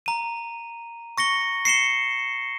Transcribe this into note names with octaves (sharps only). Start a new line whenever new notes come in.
A#5 D#7
C#6 A#6 C#7 G7
C7 C#7 E7 G7